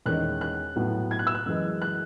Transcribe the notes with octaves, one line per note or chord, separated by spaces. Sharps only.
E2 D#3 G#3 C#4 F#6
F#6
A2 F#3 B3
G#6
F#6
E6
F#6
F#2 E3 G#3
F#6